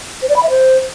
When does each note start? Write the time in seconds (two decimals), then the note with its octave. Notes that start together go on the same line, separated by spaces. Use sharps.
0.22 C5
0.29 D5
0.36 B5
0.43 E5
0.50 C5